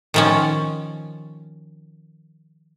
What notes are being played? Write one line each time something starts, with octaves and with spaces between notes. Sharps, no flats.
D#3 F3 C#4